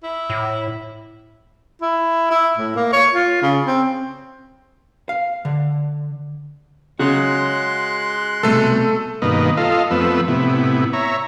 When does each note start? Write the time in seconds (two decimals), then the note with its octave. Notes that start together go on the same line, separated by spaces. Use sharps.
0.03 E4
0.30 A2
1.82 E4
2.31 E4
2.57 A2
2.76 A#3
2.93 C#5
3.12 F4
3.42 C#3
3.65 C4
5.09 F5
5.45 D3
6.99 C#3 G#3 F#4 C#5 C6 F#6
8.43 C2 B2 A3 A4
9.22 G2 B2 D#3 A#3 B4 D#5
9.57 F4 A4 D#5 F5
9.91 F2 F3 A3 B3 B4 E6
10.28 A2 C3 B3 E4
10.93 C#5 E5 A#5